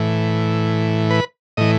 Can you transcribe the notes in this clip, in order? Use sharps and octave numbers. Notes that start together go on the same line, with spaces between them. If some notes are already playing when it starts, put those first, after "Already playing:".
Already playing: A2 E3
B4
A2 E3 D#5